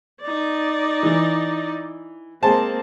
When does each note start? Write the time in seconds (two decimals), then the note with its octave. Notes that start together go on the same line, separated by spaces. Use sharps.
0.22 D#4 D5
1.03 E3
2.42 G#3 A#3 C4 C5 A5